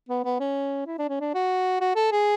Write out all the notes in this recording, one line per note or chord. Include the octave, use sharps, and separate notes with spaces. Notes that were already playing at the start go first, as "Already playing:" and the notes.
B3
B3
C#4
E4
D4
C#4
D4
F#4
F#4
A4
G#4